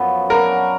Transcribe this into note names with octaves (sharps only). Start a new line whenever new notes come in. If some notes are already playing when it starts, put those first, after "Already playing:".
Already playing: F#2 F3 B3
F#3 B3 D4 F#4 A#4